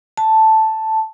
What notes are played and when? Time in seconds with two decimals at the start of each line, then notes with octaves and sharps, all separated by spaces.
0.17 A5